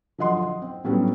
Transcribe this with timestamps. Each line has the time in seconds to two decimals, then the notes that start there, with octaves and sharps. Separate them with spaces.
0.18 D3 F3 F#3 D#5 F#5 C6
0.42 D#5
0.62 C4
0.84 A2 F#3 G3 B3 C#4 D4